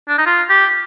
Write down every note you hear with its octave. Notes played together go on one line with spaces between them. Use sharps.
D4
D#4
F4
G4